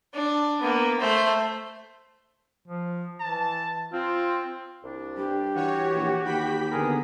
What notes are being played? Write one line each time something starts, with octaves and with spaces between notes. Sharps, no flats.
D4
A#3 B3
A3 C5
F3
E3 A5
C4 F4
C2 D4
G2 G4
E3 F#4 C#5
A#1
D#2 G5 B5 B6
D3 B3 G#4 A#4